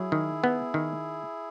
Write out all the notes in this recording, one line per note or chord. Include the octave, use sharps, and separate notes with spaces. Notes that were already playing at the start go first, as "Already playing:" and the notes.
Already playing: F#3 E4 G#4
D#3
B3
D#3